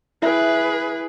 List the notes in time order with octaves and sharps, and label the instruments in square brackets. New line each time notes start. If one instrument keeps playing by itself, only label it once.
[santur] E4 G5 [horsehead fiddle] G#4 B4